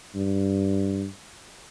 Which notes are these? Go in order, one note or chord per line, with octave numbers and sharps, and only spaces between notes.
G2